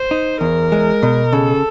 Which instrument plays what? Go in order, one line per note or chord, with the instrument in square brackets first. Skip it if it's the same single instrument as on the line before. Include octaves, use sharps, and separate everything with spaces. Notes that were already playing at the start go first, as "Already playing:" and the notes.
Already playing: [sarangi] C5
[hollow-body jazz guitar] D#4
[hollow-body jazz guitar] E2 [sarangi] A#4
[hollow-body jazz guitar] G#3
B2
[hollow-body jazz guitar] C#3 [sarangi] A4